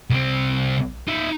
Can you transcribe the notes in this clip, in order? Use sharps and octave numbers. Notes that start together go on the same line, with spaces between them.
C2 C4
D#4 E5